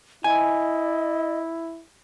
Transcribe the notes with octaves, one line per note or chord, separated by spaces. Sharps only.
E4 D#5 G#5